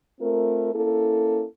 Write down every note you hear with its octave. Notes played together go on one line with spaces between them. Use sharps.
A3 C4 F4 A#4
A#3 C#4 E4 A4